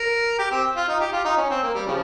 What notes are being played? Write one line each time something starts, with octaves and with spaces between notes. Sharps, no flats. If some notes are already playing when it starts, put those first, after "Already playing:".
Already playing: A#4
G4
C4
F4
D#4
G4
F4
D#4
C#4
C4
A#3
G3
C#3 F3